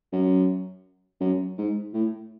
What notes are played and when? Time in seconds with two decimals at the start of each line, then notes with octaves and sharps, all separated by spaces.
0.12 F#2
1.20 F#2
1.58 G#2
1.93 A2